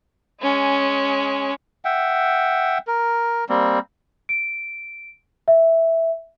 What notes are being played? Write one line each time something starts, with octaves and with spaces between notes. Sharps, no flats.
G#3 C#4
E5 F#5 G5
A#4
G3 A#3 C4
D7
E5